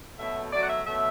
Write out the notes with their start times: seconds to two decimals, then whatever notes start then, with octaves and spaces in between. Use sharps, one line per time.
0.18 B2 F#3 A3 E5
0.52 B2 F#3 A3 D5
0.62 F#5
0.69 E5
0.86 B2 F#3 A3 E5